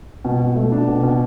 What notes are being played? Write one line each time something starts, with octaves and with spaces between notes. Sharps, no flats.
B2
B2
A3
D4
B2
B2